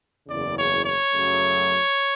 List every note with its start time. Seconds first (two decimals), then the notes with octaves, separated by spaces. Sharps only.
0.27 F#1 E2 C#3 D5
0.56 C#5
0.84 C#5
1.12 F#2 C#3 F#3 A3